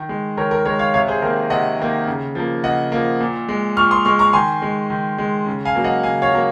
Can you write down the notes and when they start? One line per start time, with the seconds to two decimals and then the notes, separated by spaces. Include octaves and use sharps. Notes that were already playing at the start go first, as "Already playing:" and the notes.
Already playing: D#3
0.09 G#3
0.37 D#3 A#4 C#5
0.51 A#4
0.65 G#3 A#4 C#5
0.79 C#5 F5
0.94 C3 C#5 F5
1.08 G#4 C5
1.22 D#3 A#4
1.25 A#3
1.50 C3 D#5 F#5
1.79 D#3 A#3
2.07 C#3
2.35 F3 A#3
2.63 C#3 D#5 F#5
2.92 F3 A#3
3.20 A#2
3.49 G#3
3.77 A#2 C#6 F6
3.91 C6 D#6
4.05 G#3 C#6 F6
4.19 A#5 C#6
4.33 D#3 G#5 C6
4.62 G#3
4.90 D#3
5.18 G#3
5.46 C#3
5.65 F5 G#5
5.75 F#3 A#3
5.84 D#5 F#5
6.03 C#3 F5 G#5
6.22 C#5 F5
6.32 F#3 A#3